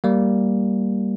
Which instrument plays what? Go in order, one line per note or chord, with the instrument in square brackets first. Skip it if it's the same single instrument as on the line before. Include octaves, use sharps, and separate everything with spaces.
[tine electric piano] G3 A#3